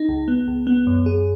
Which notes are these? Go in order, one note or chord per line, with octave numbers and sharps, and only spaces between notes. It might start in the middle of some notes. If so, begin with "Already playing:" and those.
Already playing: D#4
C#2
B3
C#2
B3
F#2
G#4